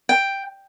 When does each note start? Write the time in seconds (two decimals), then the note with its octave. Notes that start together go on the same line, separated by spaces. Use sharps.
0.09 G5